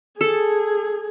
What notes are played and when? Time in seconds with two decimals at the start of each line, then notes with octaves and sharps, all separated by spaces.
0.21 G#4 A4